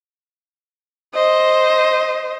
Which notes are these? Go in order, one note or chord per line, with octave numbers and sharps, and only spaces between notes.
C5 D#5